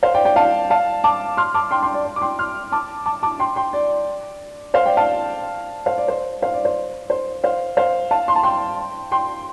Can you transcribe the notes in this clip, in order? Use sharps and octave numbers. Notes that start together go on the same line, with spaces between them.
C5 F5
D5 G5
D5 G5
F5 A5
F5 A5
A5 D6
C6 F6
A5 D6
G5 C6
G5 C6
D5
D5
D6
G5 C6
C6 F6
A5 D6
A5 D6
A5 D6
G5 C6
G5 C6
D5
C5 F5
D5 G5
F5 A5
C5 F5
D5
C5
C5 F5
D5
C5
C5
C5 F5
C5 F5
F5 A5
C6
A5
G5 C6
G5 C6